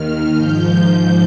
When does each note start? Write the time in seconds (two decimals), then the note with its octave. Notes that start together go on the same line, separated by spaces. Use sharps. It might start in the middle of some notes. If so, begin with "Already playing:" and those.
Already playing: D#2 D#3 F6
0.35 G#2 F3 G6
0.86 G6